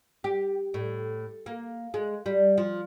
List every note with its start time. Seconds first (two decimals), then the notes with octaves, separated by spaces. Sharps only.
0.24 G4
0.74 A2
1.46 A#3
1.94 G#3
2.26 G3
2.58 F3